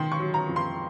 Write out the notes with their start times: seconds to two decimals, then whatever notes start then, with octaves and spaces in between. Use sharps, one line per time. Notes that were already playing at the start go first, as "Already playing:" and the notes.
Already playing: D#3 C6
0.12 C#6
0.19 F#3
0.34 A#5
0.49 F2
0.56 C6